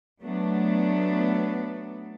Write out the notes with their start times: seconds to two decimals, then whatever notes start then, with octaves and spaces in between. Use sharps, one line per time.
0.22 F#3 A3 B3 D4